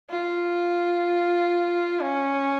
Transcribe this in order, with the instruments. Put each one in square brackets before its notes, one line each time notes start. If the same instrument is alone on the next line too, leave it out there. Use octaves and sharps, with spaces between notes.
[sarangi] F4
C#4